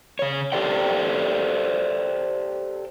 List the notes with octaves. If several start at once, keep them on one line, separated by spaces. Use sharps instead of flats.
C#3 C#5
G4 A4 C5 D5 G5